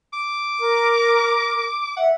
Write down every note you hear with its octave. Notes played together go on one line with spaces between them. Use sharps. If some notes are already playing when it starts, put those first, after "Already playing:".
D6
A#4
E5 F#5